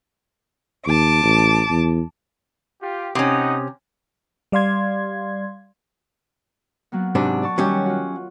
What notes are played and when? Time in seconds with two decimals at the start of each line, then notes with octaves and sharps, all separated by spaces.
0.87 D#2 A5 D6
1.23 A1
1.70 E2
2.82 F4 G4
3.15 C3 C#4 D#4 F#5 D#6
4.52 G3 D5 F5 C6 G#6
6.92 F#3 A#3 B3
7.15 G#2 C3 D4 F#4
7.42 D5 A5 C#6
7.58 D#3 F#3 G3 C#4 G4 C#5
7.86 F4 F#4